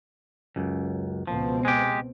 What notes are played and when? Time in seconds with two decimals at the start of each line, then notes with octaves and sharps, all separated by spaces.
0.56 C#2 F#2
1.27 C#2 B2 F3 C4
1.65 G#3 G4